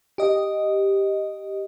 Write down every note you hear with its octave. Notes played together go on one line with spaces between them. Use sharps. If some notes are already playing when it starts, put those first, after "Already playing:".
G4 D#5